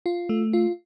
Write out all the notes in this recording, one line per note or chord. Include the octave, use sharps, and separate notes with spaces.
F4
A3
F4